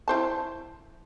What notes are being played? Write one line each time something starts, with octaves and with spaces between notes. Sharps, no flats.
E4 C5 A5